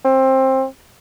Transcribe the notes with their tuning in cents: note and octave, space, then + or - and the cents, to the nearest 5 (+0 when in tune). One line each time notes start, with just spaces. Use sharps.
C4 +20